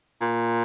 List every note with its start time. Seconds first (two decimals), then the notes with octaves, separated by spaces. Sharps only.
0.21 A#2